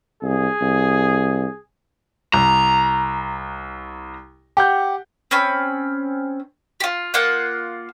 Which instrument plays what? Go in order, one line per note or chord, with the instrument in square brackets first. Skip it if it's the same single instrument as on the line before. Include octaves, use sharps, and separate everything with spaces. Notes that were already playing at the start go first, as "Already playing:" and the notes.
[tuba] C2 [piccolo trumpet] G#4
[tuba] C2
[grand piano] C2 [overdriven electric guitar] A#5
[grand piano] G4 F#5 G6
[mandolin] C4 C#4 B5
F4 G4
A#3 F4 F#5